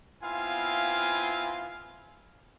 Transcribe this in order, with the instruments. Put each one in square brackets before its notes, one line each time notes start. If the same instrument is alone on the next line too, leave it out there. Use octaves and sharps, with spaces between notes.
[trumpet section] B3 C4 E4 F4 F5 G#5